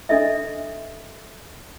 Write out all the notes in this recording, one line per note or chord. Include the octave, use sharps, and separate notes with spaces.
D4 A4 D#5 E5